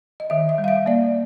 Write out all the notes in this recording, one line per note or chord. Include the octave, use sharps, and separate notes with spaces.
D#5
D#3 E5
E5
G3
F5
E5
A#3 D5